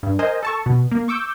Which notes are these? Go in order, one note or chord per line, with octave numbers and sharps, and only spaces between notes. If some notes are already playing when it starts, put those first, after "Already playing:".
G2
A#4 C5 D#5 G#5
A4 A5 C#6
B2
A#3
C#6 D6 E6 G6